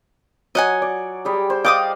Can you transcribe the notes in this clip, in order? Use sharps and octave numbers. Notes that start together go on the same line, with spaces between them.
F#3 D#5 F#5 G#5
D5
G3 G4 G#4
C5
D5 D#5 F5 G5 D6 D#6